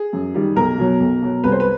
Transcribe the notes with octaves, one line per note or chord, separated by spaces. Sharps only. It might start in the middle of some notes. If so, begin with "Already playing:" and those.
Already playing: G#4
F#2
D#3 G3
B1 A#4
B2 F#3
B1
B2 F#3
C2 B4
C5
B4